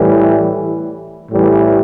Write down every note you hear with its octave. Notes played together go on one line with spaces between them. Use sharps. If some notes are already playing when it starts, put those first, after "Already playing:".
Already playing: A2 E3 G3
A2 E3 G3